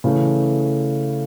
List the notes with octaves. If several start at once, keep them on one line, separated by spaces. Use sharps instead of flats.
C#3 E3 A3